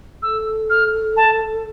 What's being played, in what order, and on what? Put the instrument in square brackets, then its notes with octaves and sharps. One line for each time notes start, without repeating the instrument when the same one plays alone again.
[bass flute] A4 [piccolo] E6
[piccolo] F6
A5